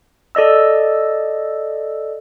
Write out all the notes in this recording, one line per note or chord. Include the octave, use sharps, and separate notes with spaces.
A4 D5 D#5 E6